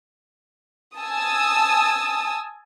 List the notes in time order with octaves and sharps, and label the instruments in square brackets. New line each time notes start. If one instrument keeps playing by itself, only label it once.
[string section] G#5 A5 D#6 E6